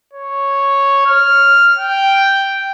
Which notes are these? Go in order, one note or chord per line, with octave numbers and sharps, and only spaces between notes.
C#5
F6
G5